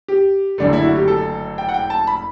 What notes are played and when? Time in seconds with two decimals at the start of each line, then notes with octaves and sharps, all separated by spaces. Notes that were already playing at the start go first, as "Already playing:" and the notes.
0.08 G4
0.58 F#1 F#2 D3 A3 D4
0.73 E4
0.85 F#4
0.96 G4
1.08 A4
1.58 G5
1.69 F#5
1.74 G5
1.90 A5
2.07 B5